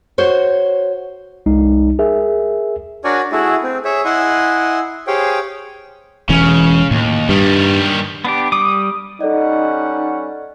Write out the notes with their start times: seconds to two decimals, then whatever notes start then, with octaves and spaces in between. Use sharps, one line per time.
0.18 F#4 C5 C#5
1.46 C2 G#3 D#4
1.99 G#4 A#4 E5
3.04 D4 F#4 A#4 C#5 D5 G#5
3.32 A3 E4 F#4 G#4
3.63 C4
3.85 G#4 C#5 E5
4.05 E4 D#5 F#5 G#5 C6
5.07 G4 G#4 C5 C#5 F5 G5
6.29 E1 C#3 E3 C#4
6.91 D#2 A2
7.29 G2 D#3 G3
8.25 B3 D4 G4
8.52 G3 D6 D#6
9.21 G3 C#4 D#4 A4 D5 D#5 F#5